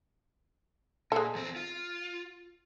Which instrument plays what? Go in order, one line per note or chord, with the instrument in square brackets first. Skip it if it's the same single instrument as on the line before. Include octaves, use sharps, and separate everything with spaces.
[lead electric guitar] A#2 [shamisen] G#3 A4
[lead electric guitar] E2 C4
F4